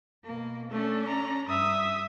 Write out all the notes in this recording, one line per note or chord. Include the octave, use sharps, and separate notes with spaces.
B2 A#3
A3 C#4 D4
A#5
G2 E5 D#6